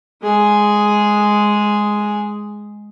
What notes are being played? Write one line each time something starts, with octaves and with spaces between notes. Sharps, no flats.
G#3 G#4